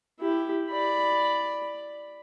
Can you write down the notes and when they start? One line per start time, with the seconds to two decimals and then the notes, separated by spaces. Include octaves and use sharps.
0.20 E4 G4
0.71 D5 B5